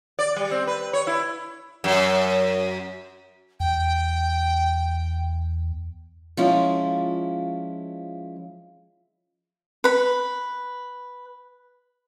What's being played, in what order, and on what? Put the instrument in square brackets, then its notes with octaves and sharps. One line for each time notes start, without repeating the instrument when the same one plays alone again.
[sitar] D5
G3
C4
B4
C#5
E4
F#2
[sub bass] E2 [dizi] G5
[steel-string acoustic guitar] F3 G#3 C#4 E4 F4
[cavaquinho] B4 B5